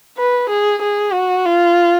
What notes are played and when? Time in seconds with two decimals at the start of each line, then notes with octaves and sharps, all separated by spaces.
0.18 B4
0.49 G#4
0.82 G#4
1.13 F#4
1.46 F4